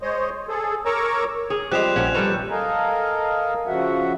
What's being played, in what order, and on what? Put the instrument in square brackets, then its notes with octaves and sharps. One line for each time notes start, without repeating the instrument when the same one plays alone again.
[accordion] G#3 C5 C#5 D#5
G#4 A4
A#4 C#5 A#5 C#6 D6 E6
[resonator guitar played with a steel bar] G#4 [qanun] C#5
[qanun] F3 G3 C4 [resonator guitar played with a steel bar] G#3 G4 [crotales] F#6 E7 F7
[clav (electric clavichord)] A#1 C#4 F#5 [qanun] F5
[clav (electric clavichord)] G3 A4 B4 [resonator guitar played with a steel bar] C#5 [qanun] A#5
[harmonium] A4 A#4 D#5 F5 G#5 A#5
C#3 F3 F#4 E5 F#5